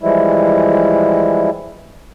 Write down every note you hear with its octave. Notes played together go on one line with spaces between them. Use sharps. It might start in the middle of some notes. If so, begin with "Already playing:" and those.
E3 F3 G3 G#3 E4